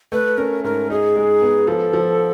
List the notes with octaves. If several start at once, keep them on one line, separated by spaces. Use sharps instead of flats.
A3 B4
C#4 A#4
G#2 A#4
D#4 G#4
G#3
B3
F3 A4
F3